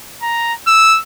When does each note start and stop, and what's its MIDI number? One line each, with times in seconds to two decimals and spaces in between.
0.22 0.53 82
0.67 0.99 88